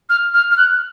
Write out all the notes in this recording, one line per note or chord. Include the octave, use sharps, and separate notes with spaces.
F6
F6
F6
F#6